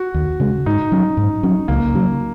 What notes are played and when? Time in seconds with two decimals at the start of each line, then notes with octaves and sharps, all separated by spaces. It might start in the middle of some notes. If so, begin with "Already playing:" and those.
Already playing: F#4
0.14 D#2
0.40 C#3 G#3
0.66 G#2 D#4
0.92 F#3 C#4
1.17 G#2
1.43 F#3 C#4
1.68 C#2 A#3
1.94 C#3 F#3